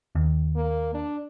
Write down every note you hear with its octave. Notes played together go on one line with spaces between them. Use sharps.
D#2
A#3
D4